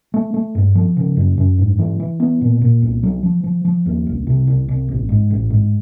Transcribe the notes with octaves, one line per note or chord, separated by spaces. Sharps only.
A3
A3
G2
F3
C#3
F#2
F#2
G#2
E3
E3
B3
A#2
A#2
C2
F#3
F3
F3
F3
D#2
C2
C3
C2
C2
A1
G#2
A1
G#2